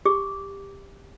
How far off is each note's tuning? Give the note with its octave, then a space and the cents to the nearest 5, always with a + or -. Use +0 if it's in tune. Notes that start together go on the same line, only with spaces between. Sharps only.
G4 +15 D6 -15